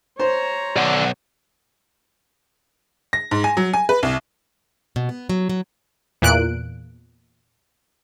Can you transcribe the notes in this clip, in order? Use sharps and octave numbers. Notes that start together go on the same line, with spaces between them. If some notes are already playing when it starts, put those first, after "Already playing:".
C5 C#5 A#5
B1 D5 F#5
A#6
G#2
G#5
F#3
G#5
B4
C2
B2
B3
F#3
F#3
E2 A#2 F#6 D7